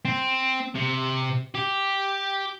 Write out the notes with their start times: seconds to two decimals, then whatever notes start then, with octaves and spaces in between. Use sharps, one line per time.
0.05 C4
0.75 C3
1.55 G4